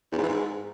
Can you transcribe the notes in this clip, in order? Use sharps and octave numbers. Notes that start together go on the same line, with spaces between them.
E2
G#2
E3
G#2